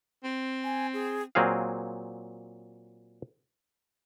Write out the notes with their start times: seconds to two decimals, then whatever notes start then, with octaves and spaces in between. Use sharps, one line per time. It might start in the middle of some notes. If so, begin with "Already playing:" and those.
0.24 C4
0.64 G#5
0.93 G#4
1.35 A#2 F#3 C4 G#4 F5